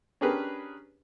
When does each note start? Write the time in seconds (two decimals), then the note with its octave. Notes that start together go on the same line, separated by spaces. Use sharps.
0.21 C#4 D4 G4 G#4 A#4 B4